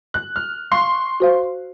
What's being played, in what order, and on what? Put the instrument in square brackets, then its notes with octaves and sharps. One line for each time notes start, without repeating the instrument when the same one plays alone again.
[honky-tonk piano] F#6
F6
[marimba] F5 [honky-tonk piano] C6 C#6 C7
[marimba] F#4 C5 F5